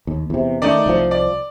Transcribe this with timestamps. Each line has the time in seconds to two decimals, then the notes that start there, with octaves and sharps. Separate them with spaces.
0.07 D#2
0.30 E2 C3
0.62 D#3 A3 D#4 D5
0.86 C2 F3
1.11 D5